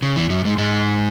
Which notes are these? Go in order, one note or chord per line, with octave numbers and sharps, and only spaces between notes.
C#3
E2 E3
F#2 F#3
G#2 G#3
G#2 G#3